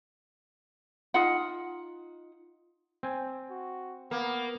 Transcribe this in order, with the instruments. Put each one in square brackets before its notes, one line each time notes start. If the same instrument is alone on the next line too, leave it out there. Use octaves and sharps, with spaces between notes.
[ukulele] D#4 F4 F#5
[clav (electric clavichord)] C4 G#5
[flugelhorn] F#4
[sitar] A#3 [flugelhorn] B3